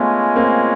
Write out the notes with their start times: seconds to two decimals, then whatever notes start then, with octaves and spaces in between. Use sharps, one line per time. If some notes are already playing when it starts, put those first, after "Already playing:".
Already playing: G#3 A3 B3 C#4 F4
0.36 A#3 C4